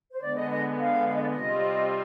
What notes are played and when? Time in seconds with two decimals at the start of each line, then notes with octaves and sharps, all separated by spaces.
0.12 C5
0.22 D3 G#3 B3 D5
0.36 D#5
0.50 D#5
0.79 F5
1.08 F5
1.15 D#5
1.23 D5
1.30 D#5
1.36 C3 G3 C4 F4